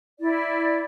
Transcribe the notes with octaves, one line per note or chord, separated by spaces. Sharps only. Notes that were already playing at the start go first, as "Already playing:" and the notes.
E4 D5